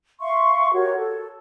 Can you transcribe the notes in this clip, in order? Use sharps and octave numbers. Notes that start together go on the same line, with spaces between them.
E5 F5 C6 C#6
F#4 G4 A#4 C#5
A4